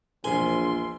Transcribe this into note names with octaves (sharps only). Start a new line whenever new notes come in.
E1 A#1 F3 G#5 C6 G7